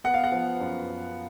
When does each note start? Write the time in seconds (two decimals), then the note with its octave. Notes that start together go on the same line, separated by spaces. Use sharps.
0.04 B3 F#5
0.14 F5
0.24 F#5
0.32 F3
0.60 F#2
0.87 F#2